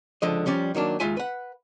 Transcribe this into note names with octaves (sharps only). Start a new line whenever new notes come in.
C#2 D3 F3 D#5
F3 G3 C#4 D5
D#3 F#3 A#3 D4
D#2 G#3 F4 E5 G#5
B4 F#5